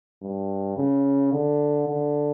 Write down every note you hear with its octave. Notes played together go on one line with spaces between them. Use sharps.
G2
C#3
D3
D3